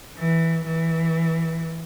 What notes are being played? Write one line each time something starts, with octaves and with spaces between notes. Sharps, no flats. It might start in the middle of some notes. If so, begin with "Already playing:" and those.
E3
E3